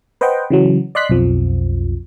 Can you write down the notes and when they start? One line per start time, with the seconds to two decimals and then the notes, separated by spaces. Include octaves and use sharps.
0.21 B4 C5 D#5 F#5 G5
0.50 C#3 E3 F#3
0.95 D5 D#5 C6 F#6 B6
1.09 B1 F2 F3